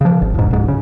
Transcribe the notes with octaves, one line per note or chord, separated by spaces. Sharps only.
C#3 F3
G#1
E1 G#2
D1 G#2
C#3